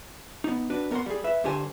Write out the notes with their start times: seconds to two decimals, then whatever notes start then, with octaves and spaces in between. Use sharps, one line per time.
0.44 B3 D#4
0.70 D4 F#4 B4
0.91 B3 A#4 C5 F#5 C6
1.06 G3 G#4
1.24 B4 E5
1.44 G2 D3 D4 G4 C5 G#5